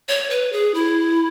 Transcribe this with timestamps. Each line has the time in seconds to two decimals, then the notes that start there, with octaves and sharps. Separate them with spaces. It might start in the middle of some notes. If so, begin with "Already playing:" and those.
0.09 C#5
0.30 B4
0.52 G#4
0.74 E4